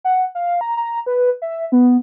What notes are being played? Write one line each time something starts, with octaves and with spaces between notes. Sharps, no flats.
F#5
F5
A#5
A#5
B4
E5
B3